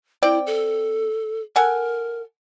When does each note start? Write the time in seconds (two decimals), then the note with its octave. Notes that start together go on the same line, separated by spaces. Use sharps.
0.23 C4 E4 D5 G5
0.46 A4
1.56 A4 A#4 F#5 G#5